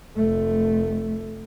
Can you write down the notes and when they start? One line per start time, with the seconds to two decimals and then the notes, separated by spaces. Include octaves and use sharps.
0.16 F1 A3